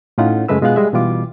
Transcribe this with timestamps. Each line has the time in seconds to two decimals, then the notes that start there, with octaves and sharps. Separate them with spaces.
0.18 A2 C#4 D#4 F4 F#5
0.49 F#2 C#3 G#3 A3 B4 E6
0.62 B2 G#3 B3 F4 F5 F#6
0.76 G3 G#3 E5
0.93 B2 E3 G3 F4 D6